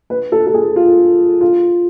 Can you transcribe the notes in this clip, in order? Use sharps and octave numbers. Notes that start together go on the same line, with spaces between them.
B4
A4
A4
G#4
F4
F4